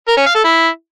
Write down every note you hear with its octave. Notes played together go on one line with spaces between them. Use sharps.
A#4
C#4
F5
A4
E4